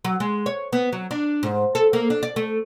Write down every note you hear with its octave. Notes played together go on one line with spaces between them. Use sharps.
F#3
G#3
C#5
B3
F#3
D4
G#2
A4
A#3
D4
D5
A3